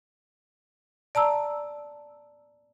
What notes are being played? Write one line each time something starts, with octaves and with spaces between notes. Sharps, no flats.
D5 A5 A#5 E6